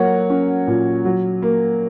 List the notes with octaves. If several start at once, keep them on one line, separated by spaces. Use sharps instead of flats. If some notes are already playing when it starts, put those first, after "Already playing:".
Already playing: F#3 A#3 C#5 F#5
C#4
A#2
F#3
A#3